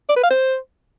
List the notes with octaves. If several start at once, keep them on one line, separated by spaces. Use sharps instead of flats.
D5
B4
F5
C5